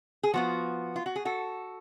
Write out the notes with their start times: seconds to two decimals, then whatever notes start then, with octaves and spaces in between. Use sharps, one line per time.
0.23 G#4
0.34 F3 B3 F4 F#4
0.96 F4
1.06 F#4
1.16 G#4
1.25 F#4 A4